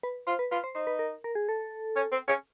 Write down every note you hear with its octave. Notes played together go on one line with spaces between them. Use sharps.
B4
F4 C5
B4
F4 B4
C5
D#4 C5
B4
A#4
A#4
G#4
A4
C#4
C4
C#4